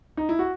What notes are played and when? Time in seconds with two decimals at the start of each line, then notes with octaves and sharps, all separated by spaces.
0.17 D#4
0.29 E4
0.39 F#4